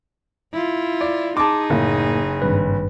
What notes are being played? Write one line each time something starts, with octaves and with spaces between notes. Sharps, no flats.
E4 F4
D5
D#4 G#4 A5 C6 D6
F#1 A2 A#3
G#1 G2 B4